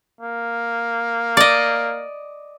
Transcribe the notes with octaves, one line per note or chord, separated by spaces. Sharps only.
A#3
D5 D#5